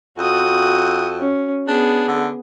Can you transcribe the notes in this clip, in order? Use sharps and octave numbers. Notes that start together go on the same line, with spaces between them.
F2 F#4 D#6
C#4
B3 D4 G#4
D3